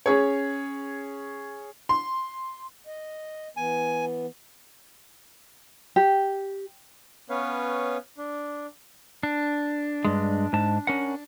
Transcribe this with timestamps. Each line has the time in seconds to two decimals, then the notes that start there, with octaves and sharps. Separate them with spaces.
0.06 C#4 G#4 C#5
1.89 C6
2.87 D#5
3.57 E3 B3 G#5
5.96 G4
7.30 B3 C#4 B4 C#5 F5
8.18 D4
9.23 D4
10.05 G2 G#3
10.53 G#2 A5
10.87 C#4 A#4 F#5